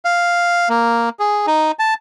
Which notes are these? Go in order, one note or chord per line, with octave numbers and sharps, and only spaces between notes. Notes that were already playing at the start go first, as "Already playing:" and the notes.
F5
A#3
G#4
D#4
A5